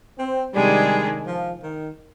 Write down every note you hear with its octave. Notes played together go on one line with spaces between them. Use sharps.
C4
C3 D#3 G3 G#3 D4 G#4
F3
D#3